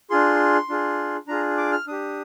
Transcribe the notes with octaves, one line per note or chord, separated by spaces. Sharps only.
D4 F4 G#4 C6
D4 F4 G#4
D4 F4 G#4 A#5
D6
F6
D4 G4 D#6